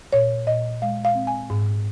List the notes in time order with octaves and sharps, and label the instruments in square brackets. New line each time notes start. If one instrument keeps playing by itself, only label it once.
[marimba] A#2 C#5
A#2 D#5
G#3 F5
F5
C4
G#5
G#2